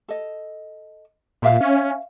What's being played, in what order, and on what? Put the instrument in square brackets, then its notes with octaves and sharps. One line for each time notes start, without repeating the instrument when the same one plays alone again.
[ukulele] A4 D#5
[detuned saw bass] A#2 [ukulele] A#4 E5 F5
[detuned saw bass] C#4